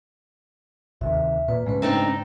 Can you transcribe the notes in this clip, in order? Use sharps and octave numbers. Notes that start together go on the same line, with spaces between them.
D2 C3 D#3 E5
A#2 B4
G#2 C#3 G#3 A3 B4
C4 D4 D#4 G5 A#5